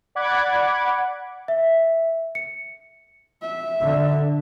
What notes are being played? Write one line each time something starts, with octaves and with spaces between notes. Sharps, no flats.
D5 F#5 B5 D6 F#6 G#6
E5
C#7
E5
D3